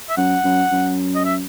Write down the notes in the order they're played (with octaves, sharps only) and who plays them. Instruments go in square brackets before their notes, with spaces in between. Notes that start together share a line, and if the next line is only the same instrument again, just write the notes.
[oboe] E5
[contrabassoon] F#2 [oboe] F#5
[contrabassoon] F#2
F#2
[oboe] D#5
E5